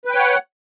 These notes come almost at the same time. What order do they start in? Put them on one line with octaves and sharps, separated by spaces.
B4 G5 C#5 F#5